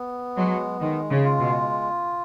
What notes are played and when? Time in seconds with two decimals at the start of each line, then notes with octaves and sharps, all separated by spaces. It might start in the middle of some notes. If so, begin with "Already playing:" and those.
Already playing: B3
0.37 F#3 G#3
0.81 D#3 G#3
1.10 C#3
1.24 F4
1.39 B2